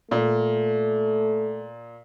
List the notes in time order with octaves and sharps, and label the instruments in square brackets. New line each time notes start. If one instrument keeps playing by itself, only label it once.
[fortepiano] A#2 [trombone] A3